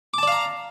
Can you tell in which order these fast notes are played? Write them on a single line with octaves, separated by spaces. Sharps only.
D6 A5 D5 F5 A#5